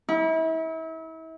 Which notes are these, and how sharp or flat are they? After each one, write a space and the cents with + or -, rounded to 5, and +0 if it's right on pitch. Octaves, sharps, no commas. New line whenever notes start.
E4 -35